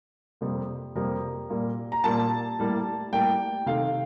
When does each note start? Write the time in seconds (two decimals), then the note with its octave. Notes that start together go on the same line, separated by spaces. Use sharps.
0.41 F2 C3 G3 A#3
0.95 F2 C3 G3 A#3 A#4
1.50 A#2 G3 A#3
1.92 A#5
2.04 A#2 G3 A#3 A5
2.59 A2 G3 A#3
3.12 A2 G3 A#3 G5
3.66 C3 D#3 A3 F5